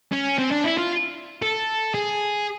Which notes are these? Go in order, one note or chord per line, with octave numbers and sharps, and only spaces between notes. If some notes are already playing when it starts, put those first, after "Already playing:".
C#4
C4
D4
E4
F4
A4
G#4